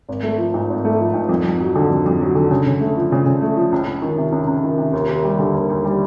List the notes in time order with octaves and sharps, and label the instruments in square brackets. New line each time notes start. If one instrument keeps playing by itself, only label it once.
[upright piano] G#1
A3
F3
G#2
G#1
A3
F3
G#2
F2
F2
F#3
D3
F2
F2
F#3
D3
C#3
C#3
A3
F3
C#3
C#3
A3
F3
C#2
C#2
D#3
C3
C#2
C#2
D#3
C3
D#2
D#2
G3
D3
D#2
D#2
G3